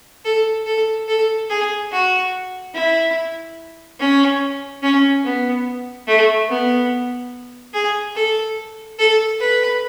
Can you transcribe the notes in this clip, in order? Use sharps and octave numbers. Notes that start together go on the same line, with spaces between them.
A4
A4
A4
G#4
F#4
E4
C#4
C#4
B3
A3
B3
G#4
A4
A4
B4